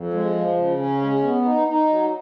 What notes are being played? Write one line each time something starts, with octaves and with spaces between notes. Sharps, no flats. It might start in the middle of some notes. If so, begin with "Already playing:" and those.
Already playing: F2
G#3
F3
C#3
C#4
G#3
B3
D#4
D#4
F#3